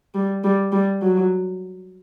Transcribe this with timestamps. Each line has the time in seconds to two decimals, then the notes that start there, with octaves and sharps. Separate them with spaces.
0.15 G3
0.44 G3
0.72 G3
1.02 F#3